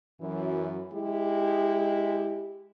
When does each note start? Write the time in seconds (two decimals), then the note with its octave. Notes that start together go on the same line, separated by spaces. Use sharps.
0.21 F#2 E3
0.93 G#3 E4 G4